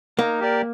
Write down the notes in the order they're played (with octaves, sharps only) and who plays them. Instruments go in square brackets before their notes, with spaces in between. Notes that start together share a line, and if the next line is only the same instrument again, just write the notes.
[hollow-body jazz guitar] A#3 [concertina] D#4
[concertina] G4 A#4 D5